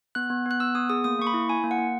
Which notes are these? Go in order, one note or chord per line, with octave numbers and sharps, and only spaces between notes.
B3 F#6
B3
B3
F#6
B3 E6
B3 D#6
G#4 D#6
A#3 D#6
A#3 C#6
B5
E4
E4 G#5
A#3
F#5
A#3